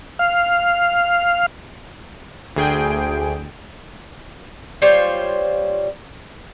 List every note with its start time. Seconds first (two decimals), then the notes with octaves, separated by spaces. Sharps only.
0.19 F5
2.56 D2 G#4 G5 D7
4.82 G3 F4 C5 C#5